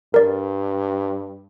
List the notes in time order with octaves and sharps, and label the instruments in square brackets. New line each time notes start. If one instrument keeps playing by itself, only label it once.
[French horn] G2 [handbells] A#4 D5